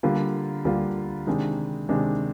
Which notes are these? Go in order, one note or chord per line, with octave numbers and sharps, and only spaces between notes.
D3 G3 A#3 F4
D3 G3 A#3 F4
C3 D#3 G#3 D4
C3 D#3 G#3 D4